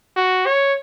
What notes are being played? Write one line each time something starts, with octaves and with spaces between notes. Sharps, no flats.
F#4
C#5